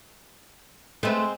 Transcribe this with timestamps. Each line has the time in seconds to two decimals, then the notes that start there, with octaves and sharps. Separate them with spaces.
1.03 G#3 A3 C4 B4